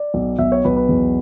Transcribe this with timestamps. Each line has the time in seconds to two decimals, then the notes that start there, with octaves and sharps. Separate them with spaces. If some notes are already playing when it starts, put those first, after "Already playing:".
Already playing: D5
0.14 B1
0.39 B1 E5
0.52 C#5
0.64 B1 B4
0.76 B4
0.89 E2